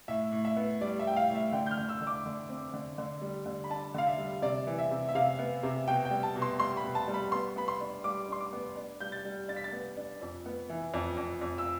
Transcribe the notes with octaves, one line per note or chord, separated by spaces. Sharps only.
A2 E5
A2
E5
B3
G3 D5
E5
A2 G5
F5
A2
E5
D3 G5
G6
F6
D3
E6
D3
D6
D3
C4
D3
D3
G3
D3
B5
D4 A5
D3 F5
E5
G3
C3 D5
E3
E5
C3
E5
C3 F5
B3
C3
B2 G5
G5
G3
A5
B2
C6
G3 C6
B5
B2
A5
G3
B5
B3 C6
B3 B5
C6
D4
G3 D6
D4 C6
D6
B3
D4
G3 G6
A6
G3
D4 A6
B6
A6
B3
D4
F2
B3
E3
F2
F2
F2
E6